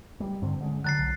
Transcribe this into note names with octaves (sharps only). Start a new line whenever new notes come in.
G3
G2 D3 C4
D3 G#3 C#4
D3 F#3 F#6 A6 C7
B1